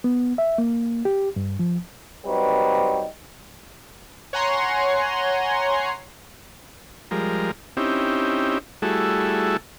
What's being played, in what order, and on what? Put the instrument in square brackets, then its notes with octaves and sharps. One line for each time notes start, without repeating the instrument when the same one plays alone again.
[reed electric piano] B3
E5
A#3
G4
G2
F3
[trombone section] F#3 G3 C4 D#4 G4 B4
[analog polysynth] C#5 F#5 G#5 A#5 C6
[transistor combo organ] F3 G3 G#3 A#4
C4 C#4 D#4 E4 G4
G3 A3 E4 F#4 G#4 A4